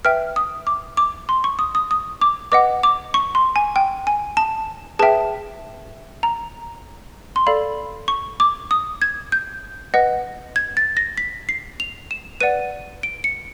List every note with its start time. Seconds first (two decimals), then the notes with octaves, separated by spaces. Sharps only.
0.05 B4 E5 G5 F6
0.36 D#6
0.67 D6
0.97 D6
1.29 C6
1.44 C#6
1.59 D#6
1.75 D#6
1.91 D#6
2.21 D6
2.52 B4 D#5 F#5 D6
2.83 D6
3.14 C#6
3.35 C6
3.56 G#5
3.76 G5
4.07 G#5
4.37 A5
4.99 G#4 B4 E5 G5 A5
6.23 A#5
7.36 C6
7.47 A4 D5 F5 B5
8.08 C#6
8.40 D6
8.71 D#6
9.02 G#6
9.32 G6
9.94 B4 D#5 F#5
10.56 G#6
10.77 A6
10.97 A#6
11.18 B6
11.49 C7
11.80 F7
12.11 E7
12.40 B4 D5 F#5 D#7
13.03 D7
13.24 C#7